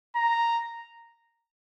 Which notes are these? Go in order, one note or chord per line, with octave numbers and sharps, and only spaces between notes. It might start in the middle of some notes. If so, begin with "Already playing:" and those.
A#5